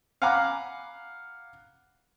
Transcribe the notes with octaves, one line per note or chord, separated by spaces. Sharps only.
F5 F#5 G#5 A#5 B5 D6